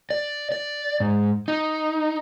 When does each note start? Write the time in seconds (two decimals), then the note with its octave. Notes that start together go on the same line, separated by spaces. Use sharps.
0.10 D5
0.52 D5
1.00 G#2
1.48 D#4